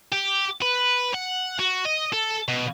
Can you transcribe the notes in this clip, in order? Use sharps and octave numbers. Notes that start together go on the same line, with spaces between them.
G4
B4
F#5
F#4
D#5
A4
B2